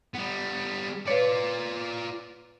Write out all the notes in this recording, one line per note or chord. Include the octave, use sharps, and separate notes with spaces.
G3 B3
F4 B4 C#5 D5